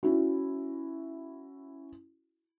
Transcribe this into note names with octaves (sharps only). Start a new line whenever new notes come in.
C#4 E4 F#4